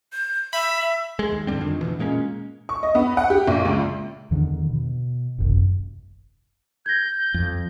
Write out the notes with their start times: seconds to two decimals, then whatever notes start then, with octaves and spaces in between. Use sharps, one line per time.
0.12 G6
0.53 E5 B5
1.19 G#3
1.32 D#2
1.47 G#2 D3 G3 C4
1.60 F2 D3 D#3
1.81 D2 B2 E3
1.99 A#2 G#3 A#3 C#4
2.69 C#6
2.83 D#5
2.95 B3
3.17 F#5
3.30 G4
3.48 A#1
3.65 C#2
4.31 E2 D3 D#3
4.69 B2
5.38 D#1 G#1 F#2 C3
6.86 G6 G#6 A#6
7.34 F2